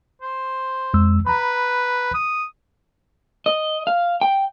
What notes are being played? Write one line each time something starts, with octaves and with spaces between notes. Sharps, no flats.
C5
F2 G#3 E6
B4 A#5 B5
D#6
D#5
F5
G5